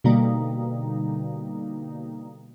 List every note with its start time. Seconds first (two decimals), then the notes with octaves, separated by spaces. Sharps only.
0.04 B2 D3 G3 A#3 D#4